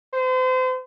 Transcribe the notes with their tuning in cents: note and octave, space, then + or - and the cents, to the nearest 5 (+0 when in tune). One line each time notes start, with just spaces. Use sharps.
C5 -35